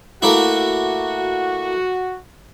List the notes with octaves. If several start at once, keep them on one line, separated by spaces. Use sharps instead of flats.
A3 A#3 E4 F#4